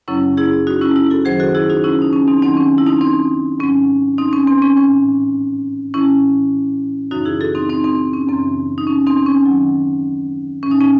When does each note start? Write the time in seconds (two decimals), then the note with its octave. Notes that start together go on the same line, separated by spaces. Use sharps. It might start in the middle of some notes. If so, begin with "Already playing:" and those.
0.08 F#2 C#3 F#3 C#4 E4
0.37 E4 G#4
0.67 D#4 F#4
0.81 C#4 E4
0.96 C#4 E4
1.10 F#4 A4
1.25 F#2 D#3 F#3 G#4 C5
1.40 F#4 A4
1.55 E4 G#4
1.69 D#4 F#4
1.84 C#4 E4
2.02 D#4
2.13 C#4
2.28 C4 D#4
2.42 D#2 D#3 F#3 C4 D#4
2.57 C#4
2.78 E4
2.86 C4 D#4
3.01 C4 D#4
3.60 G#2 F#3 C#4
4.18 C4 D#4
4.33 C#4
4.48 C4
4.62 C#4
4.77 A2 E3 C#4
5.94 A2 E3 C#4 E4
7.11 F#2 C#3 E3 D#4 F#4
7.25 E4 G#4
7.41 F#4 A4
7.55 C4 D#4
7.70 C4 D#4
7.84 C4 D#4
8.13 C#4
8.29 F#2 C#3 E3 C4
8.78 D#4
8.87 C#4
9.06 C4 D#4
9.26 C#4
9.46 D#2 D#3 F#3
10.63 A2 E3 C#4
10.71 D#4
10.81 C#4